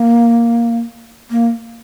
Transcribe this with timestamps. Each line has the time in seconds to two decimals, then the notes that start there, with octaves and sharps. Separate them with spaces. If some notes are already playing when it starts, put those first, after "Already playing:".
Already playing: A#3
1.31 A#3